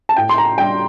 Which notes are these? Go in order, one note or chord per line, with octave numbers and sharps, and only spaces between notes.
A5
A2 G5
C6
A#5
G3 D4 G5